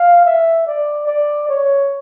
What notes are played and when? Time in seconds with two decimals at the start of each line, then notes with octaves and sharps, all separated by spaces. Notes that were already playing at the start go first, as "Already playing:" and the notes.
Already playing: F5
0.25 E5
0.67 D5
1.07 D5
1.49 C#5